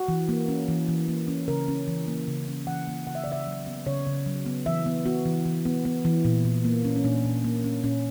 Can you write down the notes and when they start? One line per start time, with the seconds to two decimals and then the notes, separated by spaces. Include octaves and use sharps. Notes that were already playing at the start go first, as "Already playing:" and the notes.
Already playing: F#4
0.08 E3
0.29 A#3
0.48 C#4
0.68 E3
0.88 E3
1.08 A#3
1.28 C#4
1.48 C#3 A#4
1.68 C#4
1.88 E3
2.07 A#3
2.28 C#3
2.48 C#4
2.67 E3 F#5
2.87 A#3
3.07 C#3 F#5
3.15 E5
3.24 D5
3.27 C#3 E5
3.47 F#3
3.66 B3
3.86 C#3 C#5
4.06 C#3
4.26 F#3
4.46 B3
4.66 E3 E5
4.86 B3
5.05 B3 F#4
5.26 E3
5.45 E3
5.65 B3
5.85 B3
6.05 E3
6.25 A#2
6.45 A#2
6.65 A#3
6.84 C#4
6.96 C#4
7.04 A#2 D4
7.25 A#2
7.44 A#3
7.64 C#4
7.84 A#2 C#4